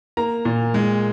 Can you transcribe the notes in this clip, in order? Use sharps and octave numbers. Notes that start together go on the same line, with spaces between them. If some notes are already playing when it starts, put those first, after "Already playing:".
A#3 A#5
A#2
G#3